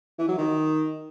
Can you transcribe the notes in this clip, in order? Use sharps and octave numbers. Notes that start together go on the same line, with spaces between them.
E3
F#3
D#3